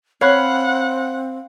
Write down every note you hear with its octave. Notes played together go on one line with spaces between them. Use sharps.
C4 C#5 F5 F#5 B5 F#6